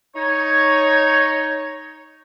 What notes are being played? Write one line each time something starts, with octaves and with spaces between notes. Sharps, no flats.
D#4 C#5